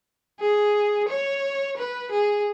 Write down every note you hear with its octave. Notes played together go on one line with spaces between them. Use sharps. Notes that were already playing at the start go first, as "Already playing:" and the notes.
G#4
C#5
B4
G#4